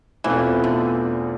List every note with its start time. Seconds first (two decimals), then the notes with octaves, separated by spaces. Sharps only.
0.24 E2 B2 E3 A3 C4 F4
0.64 D3